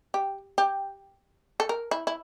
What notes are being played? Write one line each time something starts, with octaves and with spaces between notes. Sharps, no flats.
G4
G4
A4
A#4
E4
E4